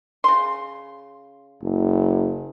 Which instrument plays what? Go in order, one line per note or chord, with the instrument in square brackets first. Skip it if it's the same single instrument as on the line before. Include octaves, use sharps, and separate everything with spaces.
[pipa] C#3 C6
[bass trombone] F#1